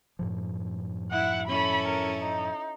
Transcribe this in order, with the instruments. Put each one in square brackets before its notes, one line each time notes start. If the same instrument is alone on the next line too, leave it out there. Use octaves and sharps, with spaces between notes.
[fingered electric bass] F#2 A2 F3
[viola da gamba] E4 [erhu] F#5
[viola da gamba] C#4 E4 A4 [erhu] B5
[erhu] A#4
D#4